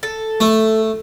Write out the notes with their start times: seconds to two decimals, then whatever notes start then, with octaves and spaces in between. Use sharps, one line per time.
0.03 A4
0.40 A3